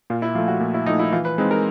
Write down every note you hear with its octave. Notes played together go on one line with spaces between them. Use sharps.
A#2 F4
E4
F3 A3 F4
F#4
A#2
E4
F3 A3 D#4
E4
E3 F4
B4
G#3 C4 D#4 B4
A#4